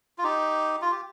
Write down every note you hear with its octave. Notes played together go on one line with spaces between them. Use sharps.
F4
D#4 G4
F4
G4